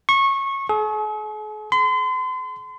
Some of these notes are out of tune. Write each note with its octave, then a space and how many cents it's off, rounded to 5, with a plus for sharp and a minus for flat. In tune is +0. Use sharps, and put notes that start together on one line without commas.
C#6 -20
G#4 +45
C6 -40